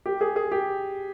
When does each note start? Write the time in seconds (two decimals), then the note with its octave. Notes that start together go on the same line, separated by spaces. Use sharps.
0.06 G4
0.21 G#4
0.36 G#4
0.52 G4